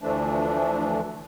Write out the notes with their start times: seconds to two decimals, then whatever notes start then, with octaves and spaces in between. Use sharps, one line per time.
0.02 D2 E3 F3 A3 D4